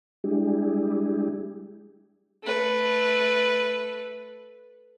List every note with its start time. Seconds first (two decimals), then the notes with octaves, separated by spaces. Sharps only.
0.24 G3 G#3 D4 E4 G4 G#4
2.43 A3 B4